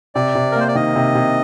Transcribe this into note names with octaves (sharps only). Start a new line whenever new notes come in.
C3 D5
C3
A#4
A#3 C5
D5
D#3 D#5
C3
C3